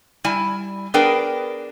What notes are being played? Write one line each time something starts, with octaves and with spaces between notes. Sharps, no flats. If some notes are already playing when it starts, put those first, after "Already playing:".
G3 E4 G#5 A5
B3 D4 G#4 A#4 B4 G5